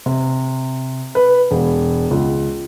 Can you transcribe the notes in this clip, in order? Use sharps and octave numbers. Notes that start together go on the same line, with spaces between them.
C3
B4
E1
C#2